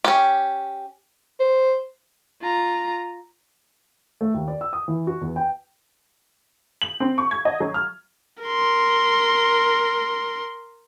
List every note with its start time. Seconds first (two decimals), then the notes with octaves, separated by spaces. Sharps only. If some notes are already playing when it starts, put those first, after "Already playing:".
0.04 C#4 G4
1.40 C5
2.42 F4 A#5
4.21 A3
4.34 D#2
4.48 D5
4.61 E6
4.73 D#6
4.88 E3
5.07 F#4
5.21 E2
5.36 G5
6.82 F#7
7.00 C4
7.18 C#6
7.31 G#6
7.45 D#5
7.60 F#3
7.74 F6
8.43 A#4 C6